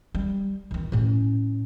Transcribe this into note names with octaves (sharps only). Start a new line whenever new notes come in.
G3
E2 D#3
A2 C#4